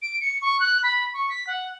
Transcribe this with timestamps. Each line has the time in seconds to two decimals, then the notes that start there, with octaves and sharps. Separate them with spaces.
0.02 D7
0.21 C#7
0.42 C#6
0.60 F#6
0.83 B5
1.14 C#6
1.30 B6
1.47 F#5